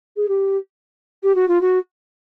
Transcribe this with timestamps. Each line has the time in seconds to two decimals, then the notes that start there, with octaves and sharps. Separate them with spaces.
0.16 G#4
0.28 G4
1.23 G4
1.35 F#4
1.48 F4
1.61 F#4